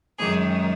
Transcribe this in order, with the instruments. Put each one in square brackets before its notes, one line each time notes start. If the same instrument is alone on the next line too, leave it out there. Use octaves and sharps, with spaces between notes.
[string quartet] F#2 D#3 G#3 G#4